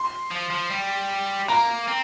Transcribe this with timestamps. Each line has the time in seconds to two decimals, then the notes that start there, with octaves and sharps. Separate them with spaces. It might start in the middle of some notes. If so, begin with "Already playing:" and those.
Already playing: C6
0.31 F3
0.50 F3
0.70 G3
1.48 A#3 A#5
1.88 C4